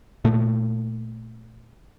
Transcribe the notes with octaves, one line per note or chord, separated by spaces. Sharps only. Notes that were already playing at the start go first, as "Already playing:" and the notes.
A#2 A3